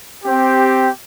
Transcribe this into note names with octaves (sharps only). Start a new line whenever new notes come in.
C4 G4